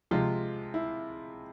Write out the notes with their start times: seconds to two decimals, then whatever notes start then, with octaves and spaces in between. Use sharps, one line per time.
0.11 C3 F3 G#3 F4
0.74 E4